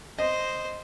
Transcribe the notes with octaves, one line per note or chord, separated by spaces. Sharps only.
C5 D#5